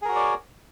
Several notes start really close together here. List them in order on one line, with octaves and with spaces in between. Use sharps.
G#4 A#4 F#4 C#5 D5